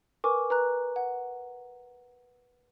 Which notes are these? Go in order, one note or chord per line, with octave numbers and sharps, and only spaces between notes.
A#4 B4 G#5 C#6 D6
B4 A#5 F#6
F#5